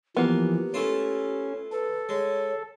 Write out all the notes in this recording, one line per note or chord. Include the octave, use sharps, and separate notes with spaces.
E3 F3 A#3 B3 G4
A3 C#4 E4 F4
A4 B4
G#3 C#5